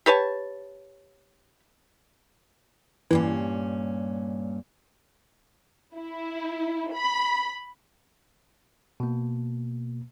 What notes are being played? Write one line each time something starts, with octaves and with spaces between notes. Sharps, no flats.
G4 B4 C#5 A5
G2 A#2 E3 C#4
E4
B5
B2 A#3